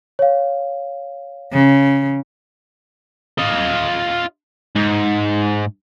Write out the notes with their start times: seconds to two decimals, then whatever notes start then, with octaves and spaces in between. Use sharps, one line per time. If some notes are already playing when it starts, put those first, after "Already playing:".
0.19 C#5 F5
1.53 C#3
3.39 F4 D#5
4.76 G#2